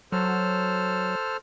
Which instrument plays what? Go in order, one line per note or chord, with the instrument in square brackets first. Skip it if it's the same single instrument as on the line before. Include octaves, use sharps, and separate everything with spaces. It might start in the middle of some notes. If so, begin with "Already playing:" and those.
[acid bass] F#3 [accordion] A4 C5 F6